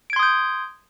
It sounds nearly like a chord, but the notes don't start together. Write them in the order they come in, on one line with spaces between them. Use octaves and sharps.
D7 G#6 C6 D#6 G6